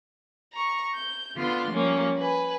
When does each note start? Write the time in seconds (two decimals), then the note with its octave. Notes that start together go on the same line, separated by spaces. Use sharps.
0.53 A#5 C#6
0.94 G6
1.36 D3 B3 D4 F4 C6
1.69 F3 G3 A#3 C#4
2.16 B4 G#5